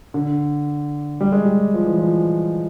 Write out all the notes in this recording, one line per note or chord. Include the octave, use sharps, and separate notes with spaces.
D3
G3
G#3
G3
F3
E3
F3